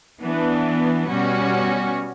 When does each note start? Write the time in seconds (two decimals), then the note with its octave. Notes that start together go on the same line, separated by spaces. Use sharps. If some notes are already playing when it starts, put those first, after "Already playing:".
0.21 E3 B3 D4
1.08 B2 G3 C#4 F#4